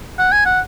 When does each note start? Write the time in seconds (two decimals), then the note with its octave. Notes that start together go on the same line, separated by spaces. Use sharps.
0.19 F#5
0.32 G#5
0.46 F#5